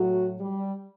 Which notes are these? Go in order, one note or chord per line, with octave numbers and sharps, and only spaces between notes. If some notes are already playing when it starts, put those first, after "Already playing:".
Already playing: A2 F#3 F#4
G3